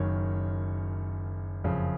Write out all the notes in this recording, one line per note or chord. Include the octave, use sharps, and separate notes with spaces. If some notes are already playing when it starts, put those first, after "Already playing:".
Already playing: F#1 F#2 D#3 C#5
F#1 F2 C#3 F3